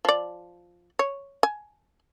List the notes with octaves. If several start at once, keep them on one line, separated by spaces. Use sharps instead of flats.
F3 D5
C#5
G#5